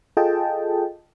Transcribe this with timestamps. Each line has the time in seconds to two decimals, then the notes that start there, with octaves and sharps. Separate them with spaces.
0.17 F4 G#4 A4 D#5 G5 A5